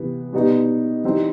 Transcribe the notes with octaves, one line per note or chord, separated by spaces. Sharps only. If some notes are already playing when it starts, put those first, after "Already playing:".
Already playing: C3 E3 B3
B2 G3 B3 D#4
E3 G3 C4 D#4